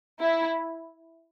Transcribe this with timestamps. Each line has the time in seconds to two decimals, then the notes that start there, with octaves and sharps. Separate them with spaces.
0.20 E4